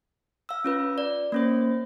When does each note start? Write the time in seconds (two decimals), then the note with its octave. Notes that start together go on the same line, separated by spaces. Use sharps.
0.49 F5 E6
0.64 C#4 F4 B4
0.98 D5
1.32 A#3 C#4 C5